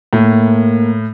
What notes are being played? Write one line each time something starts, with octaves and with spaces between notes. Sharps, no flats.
A2 A#3